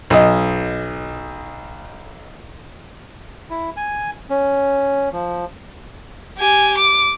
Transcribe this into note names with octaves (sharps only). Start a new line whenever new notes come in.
B1 D#5
E4
G#5
C#4
F3
G4 G#5
D6